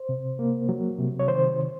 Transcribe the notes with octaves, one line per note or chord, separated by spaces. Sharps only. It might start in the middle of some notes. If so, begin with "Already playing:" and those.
Already playing: C5
C3
A#3
F#3
C3
C#5
D#3 C5